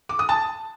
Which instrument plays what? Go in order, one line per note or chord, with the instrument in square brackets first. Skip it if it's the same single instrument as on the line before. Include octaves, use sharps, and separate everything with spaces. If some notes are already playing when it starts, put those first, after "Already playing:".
[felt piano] D6
D#6
A5